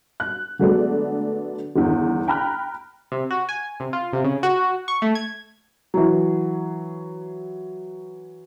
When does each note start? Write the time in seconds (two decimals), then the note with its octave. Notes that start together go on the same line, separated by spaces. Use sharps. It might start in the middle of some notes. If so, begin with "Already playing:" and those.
0.20 F#6
0.59 D3 F#3 G#3 A3 B3 D4
1.76 G1 E2 D#3
2.28 G5 A#5 B5 F6 F#6
3.12 C3
3.31 F#4
3.49 G#5
3.80 C3
3.93 F4
4.13 C3
4.24 C#3
4.43 F#4
4.88 C#6
5.02 A3
5.15 G#6
5.94 E3 F#3